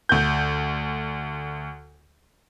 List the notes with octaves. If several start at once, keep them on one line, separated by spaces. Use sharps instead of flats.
D2 G6